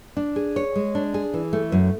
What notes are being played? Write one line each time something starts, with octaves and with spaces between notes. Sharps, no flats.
D4
G#4
C#5
G#3
D4
G#4
E3
A3
F#2